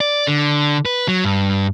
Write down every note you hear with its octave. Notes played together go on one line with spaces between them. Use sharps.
D5
D3
B4
F#3
G2